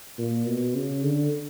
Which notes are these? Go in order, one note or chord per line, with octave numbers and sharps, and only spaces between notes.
A#2
B2
C#3
D3